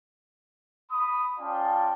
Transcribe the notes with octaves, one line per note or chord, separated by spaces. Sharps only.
B5 D#6
C#4 F4 D5 F5 G5 A5